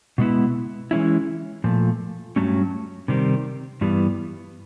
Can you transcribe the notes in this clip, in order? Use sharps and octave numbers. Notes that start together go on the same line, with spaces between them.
B2 G#3 B3 E4
E3 G#3 C#4 E4
A#2 F3 A3
G2 D#3 F#3 A3 C#4
C3 D#3 G3 C4
G2 E3 G3 B3